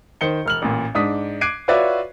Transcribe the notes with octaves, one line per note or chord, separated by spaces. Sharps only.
D#3 C5 C#7 G7
E1 F6 F#7
A1 A#2
G#2 D4 D#6 B6
D6 F#6 G#6 C7 D7 D#7
F4 F#4 B4 C#5 D5 E5